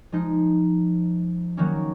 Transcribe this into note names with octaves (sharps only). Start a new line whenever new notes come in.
F3 G#3 D#4
D#3 F#3 A#3 C#4